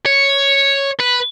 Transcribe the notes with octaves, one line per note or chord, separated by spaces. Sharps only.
C#5
B4